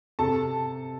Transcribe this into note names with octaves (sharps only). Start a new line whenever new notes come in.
C3 A4 A5